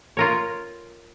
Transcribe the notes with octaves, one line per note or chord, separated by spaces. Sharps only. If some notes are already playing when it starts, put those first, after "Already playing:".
F4 A#4 C#5